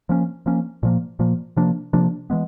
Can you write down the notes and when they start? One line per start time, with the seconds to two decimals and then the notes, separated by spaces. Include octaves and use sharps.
0.09 F3 A#3 C#4
0.46 F3 A#3 C#4
0.83 A#2 F3 A#3
1.19 A#2 F3 A#3
1.57 C3 F3 A#3 D4
1.93 C3 F3 A#3 D4
2.30 E3 G#3 B3